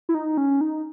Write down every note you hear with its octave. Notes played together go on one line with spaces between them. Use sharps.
E4
D#4
C#4
D#4